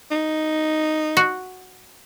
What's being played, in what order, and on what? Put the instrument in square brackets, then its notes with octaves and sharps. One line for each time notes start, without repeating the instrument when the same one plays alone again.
[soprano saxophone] D#4
[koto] F#4